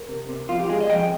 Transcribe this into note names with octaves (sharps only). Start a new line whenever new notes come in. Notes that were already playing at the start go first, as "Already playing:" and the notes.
Already playing: A#4
C3
C3
F2 F4
G4
G#3 G#4
D#5
F2 G5